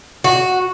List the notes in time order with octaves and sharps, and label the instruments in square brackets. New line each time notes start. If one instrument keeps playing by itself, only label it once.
[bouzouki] F#4